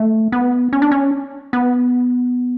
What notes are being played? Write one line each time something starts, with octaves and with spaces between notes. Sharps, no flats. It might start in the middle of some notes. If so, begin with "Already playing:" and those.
Already playing: A3
B3
C#4
D4
C#4
B3